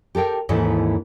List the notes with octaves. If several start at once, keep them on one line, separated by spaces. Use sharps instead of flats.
G4 A4 A#4 G5
D#2 G#2 E3 A3 C#4 A4